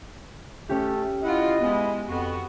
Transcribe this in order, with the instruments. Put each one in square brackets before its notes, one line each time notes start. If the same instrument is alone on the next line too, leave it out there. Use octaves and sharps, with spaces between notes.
[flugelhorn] A3 [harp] C#4 G4
[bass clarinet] E4 [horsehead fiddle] F4 F#5 [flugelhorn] D#5
[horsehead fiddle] G#3 E4 [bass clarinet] B3
[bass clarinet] F2 [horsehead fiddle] B3 F#4